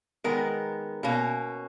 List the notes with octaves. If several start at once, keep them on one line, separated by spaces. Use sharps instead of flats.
D#3 G#3 B3 A#4
B2 A#3 C#4